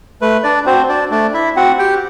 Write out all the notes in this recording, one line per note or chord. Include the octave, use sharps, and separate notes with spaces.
A3 B4
D4 D5
C4 F#4 C5
D4 D5
A3 D4 D5
E4 E5
C4 F#4 F#5
G4 G5